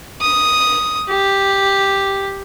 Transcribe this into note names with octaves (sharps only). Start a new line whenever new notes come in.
D#6
G4